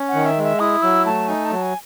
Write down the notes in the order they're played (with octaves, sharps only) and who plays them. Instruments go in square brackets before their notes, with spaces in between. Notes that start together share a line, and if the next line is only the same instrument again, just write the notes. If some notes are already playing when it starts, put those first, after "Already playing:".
Already playing: [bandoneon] C#4
[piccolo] F#5
[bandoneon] D#3
[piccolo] E5
[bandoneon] G#3
[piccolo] E5
[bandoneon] E4 [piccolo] D#6
[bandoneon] F#3 [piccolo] E6
[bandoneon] A3 [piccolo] A5
[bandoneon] D#4 [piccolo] G#5
[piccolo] A5
[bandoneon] F#3
[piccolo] G#5